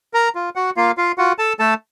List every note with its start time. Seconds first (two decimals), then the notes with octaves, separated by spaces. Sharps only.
0.14 A#4 A#5
0.35 F4
0.55 F#4 F#5
0.77 A#3 F4 F5
0.97 F4 F5
1.18 F4 F#4 F#5
1.38 A4 A5
1.59 A3 A4 A5